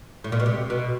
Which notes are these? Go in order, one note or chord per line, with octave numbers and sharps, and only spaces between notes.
A2
A#2
B2
C3
B2